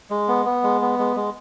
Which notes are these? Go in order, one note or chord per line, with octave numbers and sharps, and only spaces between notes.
G#3
B3
B3
G#3
B3
G#3
G#3